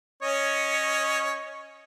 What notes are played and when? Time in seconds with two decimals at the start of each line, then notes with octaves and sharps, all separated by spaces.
0.22 C#4 C#5 D#5